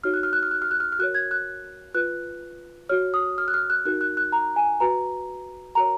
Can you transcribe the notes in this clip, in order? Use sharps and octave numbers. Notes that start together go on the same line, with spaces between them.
D#4 F#4 C#5 F6
F#6
F6
F#6
F6
F#6
F6
F#6
F6
F6
F#4 A#4 C#5 F#6
G#6
F#6
F4 B4 F#6
F#4 C#5 F6
D#6
F6
F#6
F6
F#6
D#4 F#4 A#4 F#6
F#6
F#6
A#5
G#5
F#4 B4 A#5
F#4 A#4 C#5 A#5